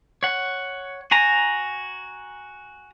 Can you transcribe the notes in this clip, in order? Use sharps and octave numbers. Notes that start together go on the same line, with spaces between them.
C#5 F#5
F#4 G#5 A#5